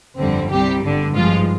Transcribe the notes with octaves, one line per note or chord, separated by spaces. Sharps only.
G1 F2 D3 G3 C4
C2 C3 G3 G4
G1 G2 D3
G#1 G2 F3 G#3 F4